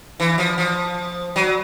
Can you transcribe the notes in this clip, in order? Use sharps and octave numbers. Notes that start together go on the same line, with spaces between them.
E3
F3
F3
F#3